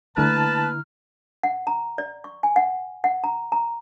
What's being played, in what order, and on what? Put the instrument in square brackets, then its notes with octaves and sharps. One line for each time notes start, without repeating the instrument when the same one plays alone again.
[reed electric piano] D3 E4 A#5 [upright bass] A3 A#3 [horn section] B4 A5 [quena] F6
[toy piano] F#5
A#5
D5
C#6
G#5
F#5
F#5
A#5
A#5